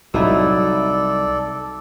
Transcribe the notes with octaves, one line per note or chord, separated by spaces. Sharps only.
C2 F#3 D#4 E4 A4 D5